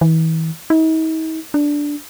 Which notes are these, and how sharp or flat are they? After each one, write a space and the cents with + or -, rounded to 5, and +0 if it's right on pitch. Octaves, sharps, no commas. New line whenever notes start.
E3 -35
D#4 +45
D4 -5